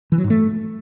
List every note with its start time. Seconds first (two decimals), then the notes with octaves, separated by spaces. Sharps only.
0.12 E3
0.18 F#3
0.24 G#2
0.30 A3